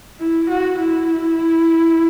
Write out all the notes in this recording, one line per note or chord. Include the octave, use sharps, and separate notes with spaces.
E4
F#4
E4